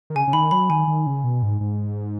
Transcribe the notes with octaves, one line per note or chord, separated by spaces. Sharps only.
D#3
C#3 G#5
C#3
D#3 B5
F#3 B5
D#3 G#5
D#3
C#3
B2
G#2
G#2